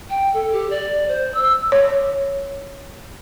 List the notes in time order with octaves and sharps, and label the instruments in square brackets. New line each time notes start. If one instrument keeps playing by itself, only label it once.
[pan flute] G5
A4
G4
D5
C5
E6
[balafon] C#5